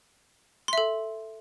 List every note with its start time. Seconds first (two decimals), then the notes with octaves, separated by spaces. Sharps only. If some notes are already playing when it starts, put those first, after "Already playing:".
0.68 C6
0.73 E5
0.78 A4